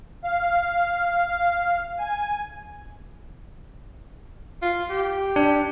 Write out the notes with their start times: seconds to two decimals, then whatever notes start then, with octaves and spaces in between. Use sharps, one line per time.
0.24 F5
1.99 G#5
4.62 F4
4.89 G4
5.36 D4